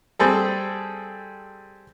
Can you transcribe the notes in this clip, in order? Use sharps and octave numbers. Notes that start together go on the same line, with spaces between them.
G3 C4 G#4 A4